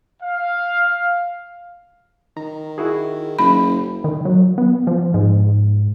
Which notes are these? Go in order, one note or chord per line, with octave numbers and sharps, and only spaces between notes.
F5
D#3 A#5
E4 F#4 G#4
F#1 B5
D#3
F#3
B3
F3
G#2